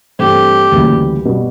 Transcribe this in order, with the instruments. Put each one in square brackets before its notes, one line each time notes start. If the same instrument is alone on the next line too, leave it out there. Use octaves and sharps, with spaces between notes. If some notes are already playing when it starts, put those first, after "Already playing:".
[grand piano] G2 E3 A3 C4 [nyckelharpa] G4
[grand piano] D2 C#3 E3 G3 A#3
B2 G3 B3